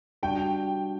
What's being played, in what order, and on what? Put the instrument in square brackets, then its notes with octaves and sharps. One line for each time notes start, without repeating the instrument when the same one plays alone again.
[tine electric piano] G3 D4 F#4 [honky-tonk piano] G5